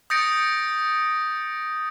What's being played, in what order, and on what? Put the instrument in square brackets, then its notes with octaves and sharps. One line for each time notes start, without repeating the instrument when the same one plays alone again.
[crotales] D#6 G6 A6 A#6 C#7 D7